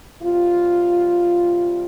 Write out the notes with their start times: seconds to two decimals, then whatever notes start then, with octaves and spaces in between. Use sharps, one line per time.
0.22 C3 G3 F4